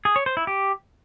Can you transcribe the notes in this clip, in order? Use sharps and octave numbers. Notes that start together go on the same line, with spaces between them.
G#4
C#5
C5
E4
G4